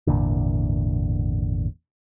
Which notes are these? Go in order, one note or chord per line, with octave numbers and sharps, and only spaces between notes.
G#1 E2 A#2 D3